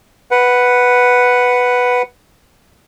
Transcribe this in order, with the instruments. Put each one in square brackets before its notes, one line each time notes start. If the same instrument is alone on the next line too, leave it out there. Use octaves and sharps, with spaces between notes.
[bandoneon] B4 F#5